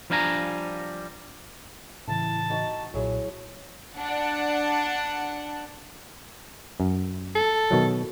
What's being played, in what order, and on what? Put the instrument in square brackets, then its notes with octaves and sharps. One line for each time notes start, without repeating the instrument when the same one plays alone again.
[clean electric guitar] F3 G3 D4 F5 G#5 A#5
[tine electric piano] A2 C#3 E3 [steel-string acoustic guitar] E4 [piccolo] A5
[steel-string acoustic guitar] D#4 F#4
[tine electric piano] B1 A#2 [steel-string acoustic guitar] F#3 E4 G#4
[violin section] D4 F#5
[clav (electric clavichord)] F#2
[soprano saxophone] A4
[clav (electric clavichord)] B2 D#3 F#3